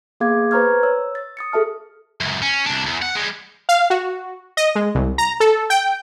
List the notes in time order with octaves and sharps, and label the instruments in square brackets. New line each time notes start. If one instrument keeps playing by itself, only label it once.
[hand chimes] A#3 B3 G#4 F5 D6 G#6
B4 C5 A#5 C#6 F6 G#6
C#5 E6
A6
D#6 A6 C#7
G#4 A4 E5 A5 F6
[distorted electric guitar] C#2 F#2
C#4
C2 D4
E2
F#5
G3 G#3
[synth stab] F5
F#4
D#5
G#3
C2
A#5
A4
G5